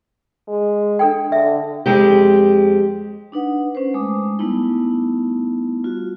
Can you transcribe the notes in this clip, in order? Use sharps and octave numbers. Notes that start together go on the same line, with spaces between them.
G#3
D4 A4 G5
D3 E5
F2 G#3 G4
D4 D#4 B4 F#5
C#4 B4 C5
G#3 A3 D6 D#6
G3 A3 B3 D#4 E4
F4 F#4